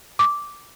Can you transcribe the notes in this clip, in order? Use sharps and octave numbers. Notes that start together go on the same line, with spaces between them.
D6